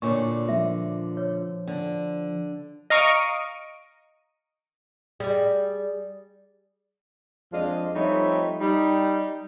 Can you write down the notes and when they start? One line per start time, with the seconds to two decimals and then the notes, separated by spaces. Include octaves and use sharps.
0.02 A#2 D3 C#5 G#5 C#6
0.48 F3 E5
1.17 C#5
1.67 D3
2.90 D#5 F5 A#5 C#6 D7 D#7
5.20 G3 G#4 D5
7.53 F2 F3 G#3 D4 D#5 F5
7.95 F3 G3 A3 C4 D#4 C#5
8.61 G3 D#4